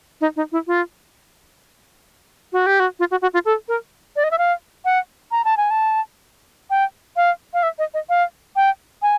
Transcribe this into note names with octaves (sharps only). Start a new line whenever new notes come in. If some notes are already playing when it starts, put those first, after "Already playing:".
D#4
D#4
E4
F4
F#4
G4
F#4
F4
F#4
F#4
F4
A4
A#4
D5
D#5
E5
F5
F#5
A#5
A5
G#5
A5
G5
F5
F5
E5
D#5
D#5
F5
G5
G#5